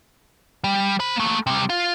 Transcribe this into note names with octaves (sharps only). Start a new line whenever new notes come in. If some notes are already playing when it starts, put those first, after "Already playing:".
G3
C5 B5
A3 A#3
C3 G3
F4